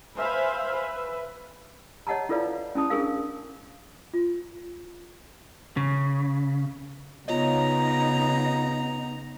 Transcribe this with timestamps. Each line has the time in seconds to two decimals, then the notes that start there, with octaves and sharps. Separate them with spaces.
0.16 B4 C5 E5 F5 G#5 B5
0.72 B4 E5
2.07 C#5 D#5 F#5 A5 A#5
2.29 E4 F4 A4 B4 D5 F5
2.75 C#4 E4 A5 D#6
2.90 D4 G#4 A#4 F5
4.14 F4
5.77 C#3
7.28 C#3 B3 D#4 F4 C#5 D#5 A#5